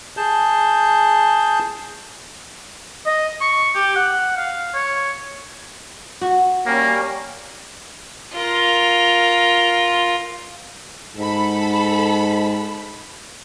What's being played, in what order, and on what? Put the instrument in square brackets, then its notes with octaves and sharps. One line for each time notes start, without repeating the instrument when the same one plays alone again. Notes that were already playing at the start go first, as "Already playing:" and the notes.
[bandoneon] G#4 A5 G6
[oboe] D#5
C#6
G4
F#5
F5
C#5
[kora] F#4
[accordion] G3 C#4 [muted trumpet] A#3
[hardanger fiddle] F4 A#4
[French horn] G#2 [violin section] A4 B5